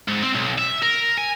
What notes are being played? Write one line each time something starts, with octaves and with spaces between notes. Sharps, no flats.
G#2
C4
B1
E5
A#4
G#5